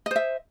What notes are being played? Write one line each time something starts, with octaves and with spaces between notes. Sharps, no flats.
C5 D#5 E5